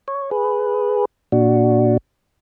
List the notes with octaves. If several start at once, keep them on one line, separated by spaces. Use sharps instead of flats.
C#5
G#4 B4
A#2 D4 F#4